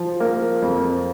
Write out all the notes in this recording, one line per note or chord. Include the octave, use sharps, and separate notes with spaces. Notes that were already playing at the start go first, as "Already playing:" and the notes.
Already playing: F3
A#3
F2